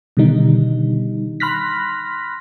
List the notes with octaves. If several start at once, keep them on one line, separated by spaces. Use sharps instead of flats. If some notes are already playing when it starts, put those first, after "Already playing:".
B2 D3 D#3 G3 D#4
B5 C6 F6 F#6 A#6 B6